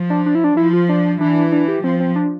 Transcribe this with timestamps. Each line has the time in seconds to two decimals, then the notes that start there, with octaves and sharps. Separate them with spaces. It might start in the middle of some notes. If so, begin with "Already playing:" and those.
Already playing: F3
0.10 D4
0.26 D4
0.35 E4
0.44 D4
0.57 F3 E4
0.73 F4
0.89 D4
1.21 E3 D4
1.52 D4
1.68 G4
1.84 F3 C4
2.00 C4
2.16 D4